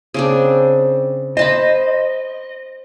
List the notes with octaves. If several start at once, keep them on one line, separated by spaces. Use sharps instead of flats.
C#3 C4 D4
C5 D#5 A5 B5